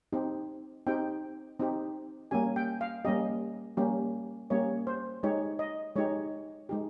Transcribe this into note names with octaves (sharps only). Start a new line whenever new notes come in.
C4 D#4 G4
C4 D#4 G4 G5
C4 D#4 G4
G3 A#3 C#4 G4 G#5
G5
F5
G3 A#3 C#4 G4 D#5
G3 A#3 C#4 G4
G3 A#3 C#4 G4 C#5
C5
G#3 D#4 G4 C#5
D#5
G#3 D#4 G4 C#5
G#3 D#4 G4